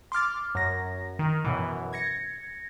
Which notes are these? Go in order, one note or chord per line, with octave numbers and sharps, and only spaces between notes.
C6 D6 F6 A6
F#2 A#6
D#3
F#2 B2 E3
G#6 A#6 C#7